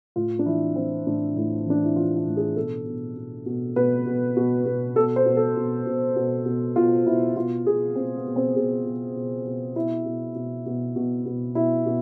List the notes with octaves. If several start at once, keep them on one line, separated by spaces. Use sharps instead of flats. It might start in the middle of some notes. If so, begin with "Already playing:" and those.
A2 F4
D4
E3 E4
E3 C4
A2 D4
A2 E4
E3 D4
E4
E3 F4
F4
A2
G#4
B2 A4
B2
B2
B2
B2 B4
B2
B2
B2
B2 A4
C5
B2
A4
B2
B2
B2
B2
B2 F4
B2 E4
B2 F4
B2 G#4
B2 C4
B3
B2
C4
B2 G#4
B2
B2
B2
B2 E4
B2
B2
B2
B2
B2
B2 E4
B2